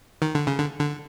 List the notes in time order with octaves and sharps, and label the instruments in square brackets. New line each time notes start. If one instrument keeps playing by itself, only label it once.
[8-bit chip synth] D#3
D3
C#3
D3
D3